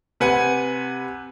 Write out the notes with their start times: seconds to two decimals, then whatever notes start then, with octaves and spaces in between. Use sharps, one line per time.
0.20 C3 B4 F#5 G#5